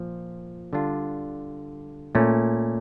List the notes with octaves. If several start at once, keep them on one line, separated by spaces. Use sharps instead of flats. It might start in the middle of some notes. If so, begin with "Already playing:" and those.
Already playing: A#2 F3
D3 G3 D4 F4
A#2 A3 C#4